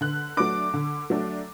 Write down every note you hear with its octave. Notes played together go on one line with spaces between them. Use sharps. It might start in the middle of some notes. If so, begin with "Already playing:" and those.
D3 F#6
F#3 A3 D4 D6
D3
F#3 A3 D4